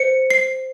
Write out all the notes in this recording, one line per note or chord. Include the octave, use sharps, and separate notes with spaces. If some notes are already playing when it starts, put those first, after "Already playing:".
Already playing: C5 C#7
C7